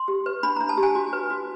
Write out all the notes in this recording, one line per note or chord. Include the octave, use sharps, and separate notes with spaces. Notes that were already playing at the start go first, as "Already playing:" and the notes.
Already playing: C6
G4
B4
D4 B5
D4 A#5
A5
G4
G#5
F#4
B4
F#4